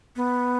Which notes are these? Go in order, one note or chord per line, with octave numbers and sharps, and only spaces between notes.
B3